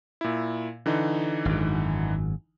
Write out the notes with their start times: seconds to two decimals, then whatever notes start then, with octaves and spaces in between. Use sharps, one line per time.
0.21 A#2 E4
0.86 D3 E3 D#4
1.45 G#1 F#2